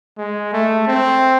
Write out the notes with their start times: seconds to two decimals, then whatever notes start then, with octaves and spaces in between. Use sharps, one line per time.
0.18 G#3
0.53 A3
0.87 C4